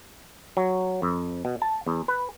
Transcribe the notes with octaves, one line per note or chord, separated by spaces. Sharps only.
F#3
F2
B2
A5
E2
B4